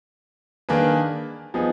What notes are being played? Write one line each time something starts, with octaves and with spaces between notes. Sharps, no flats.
D#3 A#3 D4 G#4 B4
F3 B3 D#4 G#4